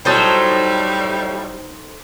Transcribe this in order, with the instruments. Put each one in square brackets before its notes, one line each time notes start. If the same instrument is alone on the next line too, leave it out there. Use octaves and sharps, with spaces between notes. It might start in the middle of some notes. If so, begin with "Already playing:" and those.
[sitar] A2 F#3 [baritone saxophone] G3 [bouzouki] D#4 A4 C5